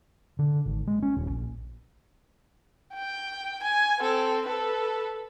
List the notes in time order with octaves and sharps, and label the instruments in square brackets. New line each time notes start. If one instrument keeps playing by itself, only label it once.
[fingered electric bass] D3
G#1
G#3
C#4
D#1
A#1
[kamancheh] G5
G#5
C4 A4
A4 B4